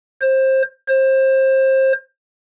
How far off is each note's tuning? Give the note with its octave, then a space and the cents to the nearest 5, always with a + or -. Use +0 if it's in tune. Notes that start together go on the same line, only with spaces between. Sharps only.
C5 +20
C5 +25